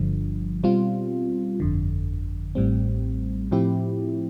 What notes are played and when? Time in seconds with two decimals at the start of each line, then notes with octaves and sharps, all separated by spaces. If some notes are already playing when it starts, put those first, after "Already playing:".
Already playing: G1 G2 D3 F3
0.64 B2 G3 C4 F4
1.60 G1 F2 D3
2.55 A1 A2 G3 C4
3.51 A2 F3 C4 E4 G4